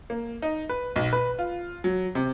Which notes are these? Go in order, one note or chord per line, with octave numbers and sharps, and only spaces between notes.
A#3
D#4
B4
B1
B4
F4
F#3
C3